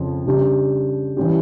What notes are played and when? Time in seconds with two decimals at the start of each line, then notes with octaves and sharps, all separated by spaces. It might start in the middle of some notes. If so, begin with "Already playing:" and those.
Already playing: F2 C#3 F3 C#4
0.26 C#3 G3 D4 G4
1.17 E3 G3 C#4 G4